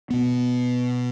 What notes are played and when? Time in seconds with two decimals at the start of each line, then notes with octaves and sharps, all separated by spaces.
0.10 B2 B3